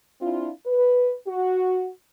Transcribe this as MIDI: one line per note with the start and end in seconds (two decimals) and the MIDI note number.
0.21 0.49 60
0.21 0.49 62
0.21 0.49 64
0.21 0.49 65
0.66 1.14 71
1.27 1.88 66